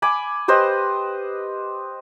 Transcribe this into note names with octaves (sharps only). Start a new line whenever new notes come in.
G#5 B5 D6
G4 B4 C5 D#5